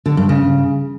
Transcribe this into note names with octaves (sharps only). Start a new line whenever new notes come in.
D3
G2
C#3